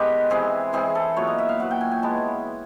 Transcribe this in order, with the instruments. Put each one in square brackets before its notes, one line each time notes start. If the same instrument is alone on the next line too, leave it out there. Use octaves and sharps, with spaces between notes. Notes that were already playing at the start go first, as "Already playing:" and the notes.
Already playing: [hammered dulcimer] D#3 G#3 B3 G4 B4
E3 G#3 C4 G#4
E3 G#3 C4 G#4
A4
A#2 F#3 B3 C#5
D#5
E5
F5
A#2 F#3 B3 F#5
G5
G#5
G#5
E3 G#3 B3 A5